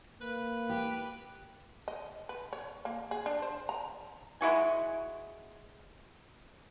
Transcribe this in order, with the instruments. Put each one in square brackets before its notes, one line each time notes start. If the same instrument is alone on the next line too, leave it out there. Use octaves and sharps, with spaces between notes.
[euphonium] A#3 [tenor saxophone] B4
[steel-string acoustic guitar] G4
[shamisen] D#5
B4
C#5
A#3
G#4
D4
C5
A#5
[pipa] G#3 E4 F#4 G#5